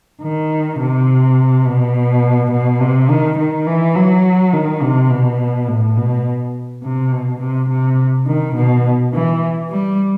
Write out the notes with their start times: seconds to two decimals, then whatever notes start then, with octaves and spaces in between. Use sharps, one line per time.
0.22 D#3
0.80 C3
1.66 B2
2.52 B2
2.80 C3
3.10 D#3
3.38 D#3
3.67 E3
3.95 F#3
4.53 D#3
4.82 C3
5.11 B2
5.68 A2
5.97 B2
6.83 C3
7.12 B2
7.41 C3
7.69 C3
8.27 D#3
8.56 B2
9.13 E3
9.70 G3